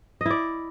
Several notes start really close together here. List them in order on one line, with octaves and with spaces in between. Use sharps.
D#5 E4 D5